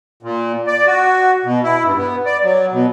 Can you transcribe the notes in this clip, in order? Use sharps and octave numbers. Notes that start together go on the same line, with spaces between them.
A#2
D5
F#4
B2
E4
G2
B3
D5
F#3
B2